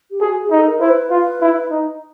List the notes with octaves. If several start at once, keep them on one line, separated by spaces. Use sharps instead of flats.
G4
F#4 G#4
G#4
D#4
A4
A#4
E4 C5
B4
F4
E4
D#4